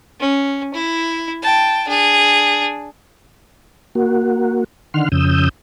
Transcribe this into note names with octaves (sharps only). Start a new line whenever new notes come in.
C#4
E4
G5 A5
D4 G#4
A#3 F#4
D3 D#3 F#5 C6 F6
F2 C#3 D#6 E6 G6